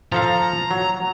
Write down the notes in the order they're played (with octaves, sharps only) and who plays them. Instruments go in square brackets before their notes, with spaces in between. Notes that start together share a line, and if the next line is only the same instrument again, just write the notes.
[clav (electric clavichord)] F3 A4 F5 [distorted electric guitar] A#5
[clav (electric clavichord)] F#3